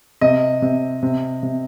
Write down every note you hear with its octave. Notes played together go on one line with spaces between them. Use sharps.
C3 D#5
C3
C3
C3